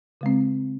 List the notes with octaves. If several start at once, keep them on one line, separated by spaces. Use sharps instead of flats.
C#3 G#3 C4